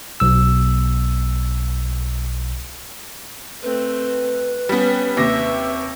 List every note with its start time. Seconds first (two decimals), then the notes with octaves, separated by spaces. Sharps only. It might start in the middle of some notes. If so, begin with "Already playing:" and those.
0.20 B1 E6
3.62 A3 C4 B4
4.69 G3 B3 C#4
5.17 D#2 C3 E5 D6 A#6